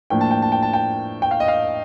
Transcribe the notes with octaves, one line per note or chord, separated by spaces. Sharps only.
A2 F3 A#3 D4 G5
A5
G5
A5
G5
A5
G5
G5
F5
D#5
F5